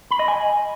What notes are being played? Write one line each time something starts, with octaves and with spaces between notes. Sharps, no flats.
B5
D#5
G#5